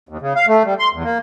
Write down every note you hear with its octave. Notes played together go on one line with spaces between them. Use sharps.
D#2
C#3
F5
A3
G3
C6
E2
A#3